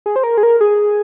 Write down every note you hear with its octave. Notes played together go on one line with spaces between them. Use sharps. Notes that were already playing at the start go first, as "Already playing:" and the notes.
G#4
C5
A#4
G#4
A#4
G#4